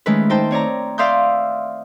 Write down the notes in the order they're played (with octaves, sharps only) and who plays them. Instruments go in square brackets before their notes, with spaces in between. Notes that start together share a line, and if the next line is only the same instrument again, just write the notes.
[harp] D#3 G#3 A3 C#4 B4
D#4 C5 G5 A5
C4 C#5 D5 A#5
D5 E5 F5 C6 D#6 G6